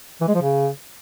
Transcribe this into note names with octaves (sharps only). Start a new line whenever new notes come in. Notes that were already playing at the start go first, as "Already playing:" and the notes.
E3
G#3
F3
C#3